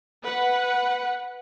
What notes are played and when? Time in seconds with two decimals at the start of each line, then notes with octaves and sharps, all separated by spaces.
0.23 B4 F#5